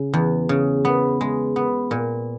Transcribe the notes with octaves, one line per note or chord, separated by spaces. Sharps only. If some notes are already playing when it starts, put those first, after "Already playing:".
Already playing: C#3
E2
C#3
B3
G#3
B3
A#2